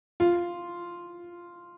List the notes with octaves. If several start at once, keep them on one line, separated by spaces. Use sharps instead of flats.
F4